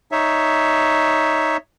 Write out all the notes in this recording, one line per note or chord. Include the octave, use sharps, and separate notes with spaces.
D#4 C#5 E5